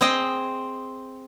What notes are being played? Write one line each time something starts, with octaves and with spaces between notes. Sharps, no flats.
C4 G#4 C5 D#5 G5